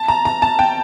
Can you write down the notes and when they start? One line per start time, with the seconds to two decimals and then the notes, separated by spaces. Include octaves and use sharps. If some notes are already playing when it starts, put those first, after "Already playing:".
Already playing: A5
0.08 A#5
0.25 A#5
0.42 A5
0.59 G5